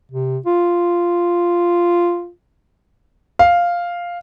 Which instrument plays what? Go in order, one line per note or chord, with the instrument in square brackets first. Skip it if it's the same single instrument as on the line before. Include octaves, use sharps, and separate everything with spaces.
[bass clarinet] C3
F4
[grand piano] F5